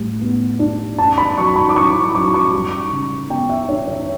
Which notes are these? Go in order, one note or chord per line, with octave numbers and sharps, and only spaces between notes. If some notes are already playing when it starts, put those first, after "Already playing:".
Already playing: A2 G3
B3
D4
C#4 A5
B5
F#3 C#6
B5
D6
E4 C#6
F#3 D6
C#6
G3
C#3
B3 G5
E5
D4 C#5
C#5